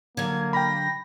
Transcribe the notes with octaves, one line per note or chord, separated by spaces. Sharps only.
D3 F#3 A#3 G#6
G5 B5 A#6